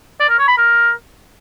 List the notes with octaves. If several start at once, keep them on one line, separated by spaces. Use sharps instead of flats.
D5
A#4
C#5
B5
A#4